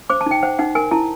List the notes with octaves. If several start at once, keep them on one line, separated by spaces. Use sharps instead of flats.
C5 D6
A5
D#4 G5
C5 F#5
D#4 F#5
A#4 G#5
E4 A5